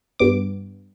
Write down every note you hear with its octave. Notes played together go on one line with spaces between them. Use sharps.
G2 B3 D6